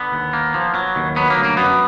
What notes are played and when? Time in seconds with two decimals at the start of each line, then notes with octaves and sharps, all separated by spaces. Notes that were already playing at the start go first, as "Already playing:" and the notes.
Already playing: D3 B3
0.12 D#2
0.33 A#3
0.54 F3
0.75 F#3
0.96 D#2
1.16 F#3 B3
1.30 A#3
1.37 D2
1.44 A#3
1.57 F#2 B3